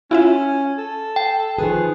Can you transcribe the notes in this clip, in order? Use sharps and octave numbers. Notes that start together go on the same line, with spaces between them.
C#4 E4 F4 E5
A4
G5
D#3 F3 G#4 B4